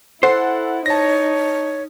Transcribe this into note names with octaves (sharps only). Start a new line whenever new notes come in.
E4 A4 C5 F#5
D#4 C#5 A5 A#6